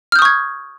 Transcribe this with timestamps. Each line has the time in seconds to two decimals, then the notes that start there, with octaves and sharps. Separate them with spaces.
0.12 F6
0.16 G6
0.19 D#6
0.22 C#6
0.25 G#6